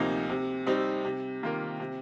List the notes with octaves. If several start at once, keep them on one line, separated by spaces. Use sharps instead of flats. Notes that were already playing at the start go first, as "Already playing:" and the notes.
Already playing: D2 C3 F3 A#3 D#4
C3
G3 C4 D#4
C3
D#3 A#3 F4 A#4
C3